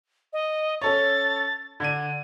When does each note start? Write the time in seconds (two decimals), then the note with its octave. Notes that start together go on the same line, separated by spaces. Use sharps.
0.33 D#5
0.82 C#4 A4 C#5 A6
1.80 D3 D4 G#6 D#7